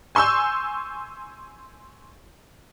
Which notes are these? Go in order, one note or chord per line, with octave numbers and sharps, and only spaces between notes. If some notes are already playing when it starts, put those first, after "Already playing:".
G#5 C6 C#6 E6 G6